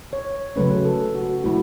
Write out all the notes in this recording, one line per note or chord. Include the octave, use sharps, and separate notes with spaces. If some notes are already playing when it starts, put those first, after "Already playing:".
C#5
C#3 F#3 A3 C#4 B4
A4
F#4
F#3 A3 E4 F#4